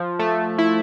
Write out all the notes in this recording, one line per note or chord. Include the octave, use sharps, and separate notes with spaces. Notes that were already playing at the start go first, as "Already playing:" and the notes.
Already playing: F3
A3
E4